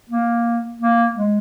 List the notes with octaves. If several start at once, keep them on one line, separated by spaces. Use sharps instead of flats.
A#3
A#3
G#3